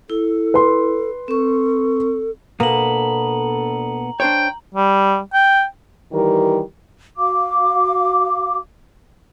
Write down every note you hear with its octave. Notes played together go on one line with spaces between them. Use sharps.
E4 A4
B4 C6
C4 A4 C#6
B2 A#3 B3 D4 A4 A#5 F#7
D4 C5 C#5 G5
G3
G5
D#3 E3 G3 G4 A#4
F#4 F5 D6